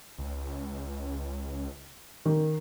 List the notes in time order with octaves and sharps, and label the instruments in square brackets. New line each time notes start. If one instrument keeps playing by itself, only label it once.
[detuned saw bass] C#2
[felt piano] D#3